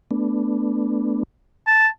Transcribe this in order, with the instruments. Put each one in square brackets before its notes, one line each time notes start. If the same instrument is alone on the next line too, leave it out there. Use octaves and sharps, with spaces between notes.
[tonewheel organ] A3 B3 D4
[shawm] A5